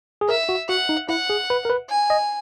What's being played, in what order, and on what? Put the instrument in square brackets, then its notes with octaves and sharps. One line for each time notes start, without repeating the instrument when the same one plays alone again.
[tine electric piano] G#4
[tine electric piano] A#4 [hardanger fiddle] E5
[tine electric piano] F#4
[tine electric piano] F#4 [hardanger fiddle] F#5
[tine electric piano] D#4
[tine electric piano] E4 [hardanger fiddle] F#5
[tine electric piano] G#4
B4
A#4
B4
[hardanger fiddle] G#5
[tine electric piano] D#5